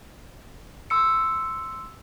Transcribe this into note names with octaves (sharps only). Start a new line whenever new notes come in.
C6 E6 C#7